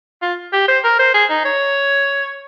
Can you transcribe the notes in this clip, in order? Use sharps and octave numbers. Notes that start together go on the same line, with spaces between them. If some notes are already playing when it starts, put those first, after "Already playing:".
F4
G4
C5
A#4
C5
G#4
D#4
C#5